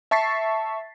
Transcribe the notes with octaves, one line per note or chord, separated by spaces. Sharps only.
E5 A5 C#6 A6 B6 C7